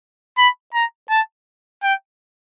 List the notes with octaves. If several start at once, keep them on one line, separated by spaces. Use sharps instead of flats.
B5
A#5
A5
G5